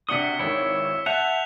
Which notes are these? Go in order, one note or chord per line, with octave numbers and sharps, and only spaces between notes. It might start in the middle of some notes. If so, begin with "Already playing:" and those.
C3 D4 F#4 D#6 B6 C#7 G7
G#1 D#3 E4 C#5
E5 F#5 A5 F#6 G6 F7